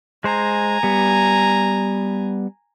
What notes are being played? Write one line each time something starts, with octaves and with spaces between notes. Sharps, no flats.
G#3 C5 G#5 A#5
G3 B3